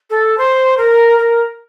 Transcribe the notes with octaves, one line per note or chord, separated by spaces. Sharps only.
A4
C5
A#4
A#4